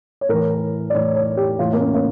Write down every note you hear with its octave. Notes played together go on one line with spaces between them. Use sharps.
C#5
A2 E3 A#4
D5
A2 E3 C#5
C#5
G4
A2 E3 F4
A#3
C#4
A#3